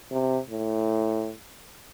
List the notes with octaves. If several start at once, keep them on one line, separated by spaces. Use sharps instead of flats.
C3
A2